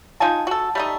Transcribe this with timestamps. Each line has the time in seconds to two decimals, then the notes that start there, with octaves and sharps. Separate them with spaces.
0.20 D#4 F4 G#5 A5
0.47 F#4 A4
0.75 G3 A3 D#4